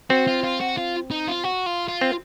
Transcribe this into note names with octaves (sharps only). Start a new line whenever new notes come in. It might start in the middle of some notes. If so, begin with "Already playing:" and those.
C4 F#4
F4
F4
F#4
F4
D#4
F4
F#4
F4
F4
C4